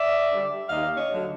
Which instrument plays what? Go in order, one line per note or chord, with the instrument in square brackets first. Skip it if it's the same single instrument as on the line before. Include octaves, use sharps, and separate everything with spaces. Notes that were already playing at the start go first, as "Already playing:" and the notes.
Already playing: [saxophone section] D5 E5
D3 G3
D#2 D#5 F5
C#5 D#5
D3 F#3 A3